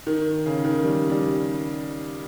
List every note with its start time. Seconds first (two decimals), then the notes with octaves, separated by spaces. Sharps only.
0.07 D#3
0.46 C#3
0.65 D#3
0.84 G3
1.10 G3